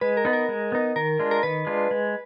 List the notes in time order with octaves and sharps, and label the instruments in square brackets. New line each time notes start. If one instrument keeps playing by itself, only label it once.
[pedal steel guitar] G#3 [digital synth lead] B4
[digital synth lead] A#4
[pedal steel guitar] B3 D#4
[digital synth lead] A#4
[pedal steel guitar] G#3
B3 D#4
[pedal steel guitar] D#3 [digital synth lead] A#4
[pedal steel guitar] G#3 D4 F4
[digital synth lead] A#4
[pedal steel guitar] D#3 [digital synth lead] B4
[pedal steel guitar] G#3 D4 F4
G#3